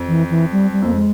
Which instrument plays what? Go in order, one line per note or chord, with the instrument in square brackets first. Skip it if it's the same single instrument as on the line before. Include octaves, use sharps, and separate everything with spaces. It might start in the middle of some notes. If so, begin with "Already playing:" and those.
Already playing: [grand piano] F2
[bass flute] E3
E3
G3
G3
[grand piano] F2 [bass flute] A#3
[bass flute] G#3